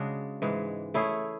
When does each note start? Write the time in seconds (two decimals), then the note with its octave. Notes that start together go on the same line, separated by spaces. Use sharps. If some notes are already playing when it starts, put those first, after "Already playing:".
Already playing: C#3 G#3 D4 F#4
0.42 G#2 E3 G#3
0.94 A3 E4 G#4 C#5